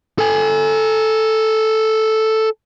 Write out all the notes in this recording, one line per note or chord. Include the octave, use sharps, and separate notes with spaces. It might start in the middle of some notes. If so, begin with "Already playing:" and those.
A4 G#5